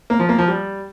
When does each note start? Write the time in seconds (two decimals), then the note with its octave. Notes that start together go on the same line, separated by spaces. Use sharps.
0.10 A#3
0.19 F3
0.29 A#3
0.38 F3
0.48 G3